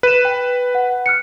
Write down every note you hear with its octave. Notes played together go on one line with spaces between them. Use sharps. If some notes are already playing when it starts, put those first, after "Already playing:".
B4 D#7 E7
G5
F#5
F6 F#6 C#7